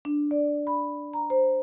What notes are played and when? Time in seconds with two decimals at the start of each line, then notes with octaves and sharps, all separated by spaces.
0.05 D4
0.31 D5
0.67 B5
1.13 A#5
1.30 C5